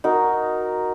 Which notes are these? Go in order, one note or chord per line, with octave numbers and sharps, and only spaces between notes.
D#4 F#4 A#4